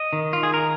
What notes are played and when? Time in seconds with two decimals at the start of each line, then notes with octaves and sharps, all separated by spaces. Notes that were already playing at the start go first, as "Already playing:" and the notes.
Already playing: D#5
0.13 D#3
0.33 F4
0.43 G#4
0.54 A#4